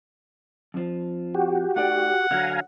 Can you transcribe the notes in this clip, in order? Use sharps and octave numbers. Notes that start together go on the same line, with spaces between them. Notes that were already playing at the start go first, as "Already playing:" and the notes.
F2 F3
F#4 G4
A3 D#4 D5 F#5
D3 F#3 F#4 F5 G#5 A#5